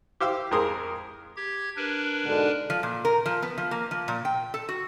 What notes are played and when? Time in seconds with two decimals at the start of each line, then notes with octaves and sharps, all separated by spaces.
0.20 G4 C5 F5 E6
0.51 F2 G#3 G#4 A#4 C6 D#6
1.36 G4 G#6
1.76 D4 A#4 B4
2.25 G#2 B2 D3
2.70 F3
2.83 A#2
3.05 A#4
3.26 F3
3.42 B3
3.58 F3
3.71 A#3
3.91 F3
4.08 A#2
4.25 G5
4.54 A4
4.69 F#4